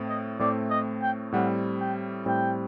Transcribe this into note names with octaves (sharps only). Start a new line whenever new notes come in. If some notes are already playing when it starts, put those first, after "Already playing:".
Already playing: A2 A3 C4
D#5
A2 A3 C4 D5
D#5
G5
A2 G3 C4 F#5
G5
A2 G3 C4 G5